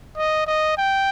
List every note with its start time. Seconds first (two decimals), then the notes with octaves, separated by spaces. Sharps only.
0.17 D#5
0.47 D#5
0.77 G5